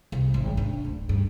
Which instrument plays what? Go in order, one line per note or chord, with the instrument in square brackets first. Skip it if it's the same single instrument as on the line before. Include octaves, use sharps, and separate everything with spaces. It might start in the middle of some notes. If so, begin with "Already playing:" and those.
[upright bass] C2
G#1
D4
D1
G2